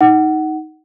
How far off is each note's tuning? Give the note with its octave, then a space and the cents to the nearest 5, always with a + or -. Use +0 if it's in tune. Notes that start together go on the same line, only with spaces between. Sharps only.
D#4 +10 F#5 +15